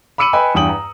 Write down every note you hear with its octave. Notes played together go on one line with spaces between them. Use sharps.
B5 D6 E6 C#7 D#7 F#7
B4 D#5 G5 G#5 B5
E2 G2 G5 D#6 F#7
A#5